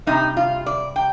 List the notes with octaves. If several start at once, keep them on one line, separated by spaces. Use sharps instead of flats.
C3 G3 D#4
F4
D5
G5